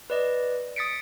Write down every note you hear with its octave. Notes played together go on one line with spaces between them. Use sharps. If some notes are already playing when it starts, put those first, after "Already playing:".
B4 D5 D#5
D#6 A6 B6 C#7 D7